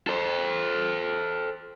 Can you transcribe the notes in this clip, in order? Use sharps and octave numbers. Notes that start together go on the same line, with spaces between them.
A4 C5